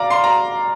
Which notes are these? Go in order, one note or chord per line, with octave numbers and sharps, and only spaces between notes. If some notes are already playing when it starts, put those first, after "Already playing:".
Already playing: D5 F5 A#5
C6
A#5